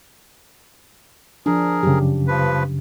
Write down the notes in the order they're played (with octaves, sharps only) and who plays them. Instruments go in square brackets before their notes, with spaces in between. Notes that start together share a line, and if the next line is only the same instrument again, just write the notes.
[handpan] F3 D4 [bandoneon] G#4 A#4
[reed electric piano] F#2 C#3 [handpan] G4
[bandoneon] G2 F3 B4